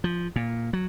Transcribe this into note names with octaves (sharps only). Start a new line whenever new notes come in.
F3
A#2
F#3